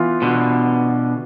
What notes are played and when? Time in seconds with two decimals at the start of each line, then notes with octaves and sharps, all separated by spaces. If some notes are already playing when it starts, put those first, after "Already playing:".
Already playing: E3 B3 F4
0.22 B2 D3